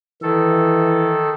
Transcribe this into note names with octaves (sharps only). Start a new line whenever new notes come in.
D#3 E3 A4